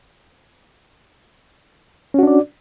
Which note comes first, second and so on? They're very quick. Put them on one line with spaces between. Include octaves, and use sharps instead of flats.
C#4 F#4 D4 D5